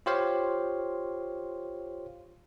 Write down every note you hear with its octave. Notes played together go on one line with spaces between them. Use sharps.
F4 G4 C5 C#5 F5